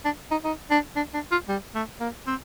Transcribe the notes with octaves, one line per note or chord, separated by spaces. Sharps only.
D4
D#4
D#4
D4
D4
D4
F4
G3
A3
A#3
C4